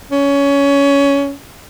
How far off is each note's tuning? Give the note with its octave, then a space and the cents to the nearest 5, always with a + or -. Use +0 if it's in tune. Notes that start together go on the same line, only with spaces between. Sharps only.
C#4 +20